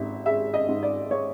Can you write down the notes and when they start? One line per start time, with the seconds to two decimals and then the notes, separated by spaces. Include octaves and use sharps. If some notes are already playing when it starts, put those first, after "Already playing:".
Already playing: G#1 E5
0.26 G#3 E5
0.54 D#5
0.68 G#2
0.83 D5
1.11 G#3 C#5